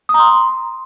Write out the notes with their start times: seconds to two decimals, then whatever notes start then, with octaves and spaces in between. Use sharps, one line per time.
0.09 D#6
0.14 A#5
0.19 C6